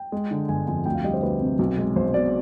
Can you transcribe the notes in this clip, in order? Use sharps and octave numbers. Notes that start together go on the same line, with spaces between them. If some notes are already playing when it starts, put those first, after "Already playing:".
Already playing: G5
G#3
D3
G1 G#5
F2 G#5
D2 G5
F5
G3 D#5
C5
D2 B4
C3
B1
G#3
B1 C5
B2 D5